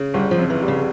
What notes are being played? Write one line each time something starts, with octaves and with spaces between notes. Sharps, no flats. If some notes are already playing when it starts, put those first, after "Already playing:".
Already playing: C#3
G1 G3
F3
F2
E3
G3
C#3